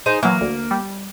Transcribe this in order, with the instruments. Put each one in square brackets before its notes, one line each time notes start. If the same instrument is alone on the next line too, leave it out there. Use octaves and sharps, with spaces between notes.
[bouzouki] D#4 G#4 C5
[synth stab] E3 F#3 [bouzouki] A#3
[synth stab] D2
G3